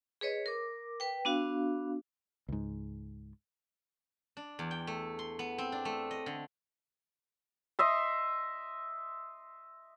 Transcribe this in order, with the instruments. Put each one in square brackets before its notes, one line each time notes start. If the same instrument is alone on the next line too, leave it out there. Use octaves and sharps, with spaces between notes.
[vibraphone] G#4 B4 C#5 D#5
A#4 D6
B4 G5
B3 D4 F#4 F5
[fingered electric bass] C#2 G#2
[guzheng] D4
E2
G5
A3
C6
B3
C4
D4
A3
D#5
D3
[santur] D#5 E5 C6